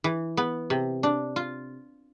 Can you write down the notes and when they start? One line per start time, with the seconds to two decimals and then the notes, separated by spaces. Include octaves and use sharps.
0.04 E3
0.37 B3
0.70 C3
1.03 D4
1.36 F4